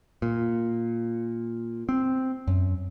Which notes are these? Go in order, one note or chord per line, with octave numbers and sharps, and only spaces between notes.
A#2
C4
F#2